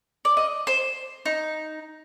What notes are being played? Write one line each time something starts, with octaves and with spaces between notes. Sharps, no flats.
D5
D#5
C5
D#4